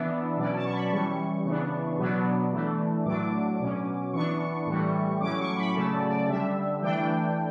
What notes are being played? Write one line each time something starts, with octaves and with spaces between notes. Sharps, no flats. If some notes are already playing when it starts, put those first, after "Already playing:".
Already playing: E3 B3 D4 E5
B2 F#3 C#4 D5
A5
C#6
B5
E3 G3 C#4 C#6
C#3 E3 B3 D4
B2 F#3 B3 D4
E3 A3 D4
A2 F#3 A3 D4 D6
B2 F#3 C#4
E3 B3 D4 C#6
A2 E3 G3
A2 F#3 C#4 D6
C#6
B5
C#3 F#3 A3 C#4 A5
D5
D5
D3 G3 D4 E5
E3 A3 D4 G5